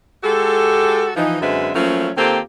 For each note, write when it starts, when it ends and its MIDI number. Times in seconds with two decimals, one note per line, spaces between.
0.24 1.10 56
0.24 1.10 66
0.24 1.10 67
0.24 1.10 69
1.16 1.40 52
1.16 1.40 53
1.16 1.40 63
1.41 1.70 42
1.41 1.70 50
1.41 1.70 56
1.41 1.70 60
1.41 1.70 71
1.41 1.70 76
1.74 2.10 53
1.74 2.10 54
1.74 2.10 57
1.74 2.10 58
1.74 2.10 61
2.17 2.39 51
2.17 2.39 58
2.17 2.39 60
2.17 2.39 65
2.17 2.39 67
2.17 2.39 69